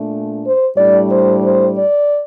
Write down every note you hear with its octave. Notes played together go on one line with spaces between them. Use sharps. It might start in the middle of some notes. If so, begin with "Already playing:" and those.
Already playing: A#2 A3 D4
C5
A2 G3 D4 D5
C5
C5
D5